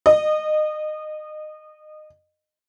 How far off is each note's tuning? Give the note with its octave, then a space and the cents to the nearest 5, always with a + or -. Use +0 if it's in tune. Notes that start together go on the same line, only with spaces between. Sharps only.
D#5 -25